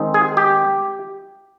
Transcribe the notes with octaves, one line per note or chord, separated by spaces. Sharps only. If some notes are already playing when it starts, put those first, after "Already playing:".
Already playing: D#3 G#3 C4 D#4
G#4
G4